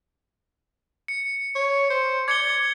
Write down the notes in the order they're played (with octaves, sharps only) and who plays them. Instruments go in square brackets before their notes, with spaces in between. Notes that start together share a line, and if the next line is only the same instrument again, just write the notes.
[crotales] C#7
[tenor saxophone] C#5
C5
[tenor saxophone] D5 [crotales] G#6 C#7 G7